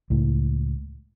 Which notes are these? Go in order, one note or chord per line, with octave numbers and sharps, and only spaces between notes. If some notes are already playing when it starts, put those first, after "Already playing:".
C#2 A2